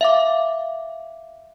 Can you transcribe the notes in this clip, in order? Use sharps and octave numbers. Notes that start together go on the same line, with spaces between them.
E5 F5 D6